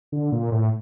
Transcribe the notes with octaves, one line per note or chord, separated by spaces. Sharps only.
D3
A#2
A2